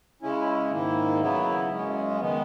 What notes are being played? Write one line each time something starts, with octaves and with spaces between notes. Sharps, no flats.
C#3 G#3 C#4 E4
G#2 D#3 A#3 E4
C#3 F#3 B3 E4
F#2 C#3 G#3 C#4
D#3 G#3 B3